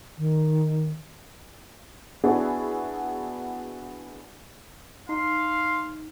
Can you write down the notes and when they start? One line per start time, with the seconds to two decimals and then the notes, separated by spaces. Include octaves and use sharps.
0.18 D#3
2.24 B3 D4 E4 F#4 G#4
5.09 D#4 F5 C6